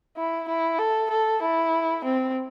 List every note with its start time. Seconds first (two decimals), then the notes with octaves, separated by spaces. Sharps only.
0.17 E4
0.48 E4
0.78 A4
1.10 A4
1.42 E4
2.04 C4